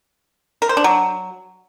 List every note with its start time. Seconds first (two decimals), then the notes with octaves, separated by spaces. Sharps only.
0.62 A#4
0.69 C5
0.77 D4
0.84 F#3